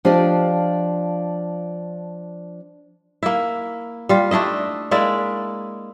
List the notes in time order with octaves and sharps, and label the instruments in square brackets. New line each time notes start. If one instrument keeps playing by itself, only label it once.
[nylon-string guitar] F3 D4 F4 G4 D5 D#5
[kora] A#3 E4
G3 F4
A3 D4 E4 D#5
G#3 A#3 E4 D5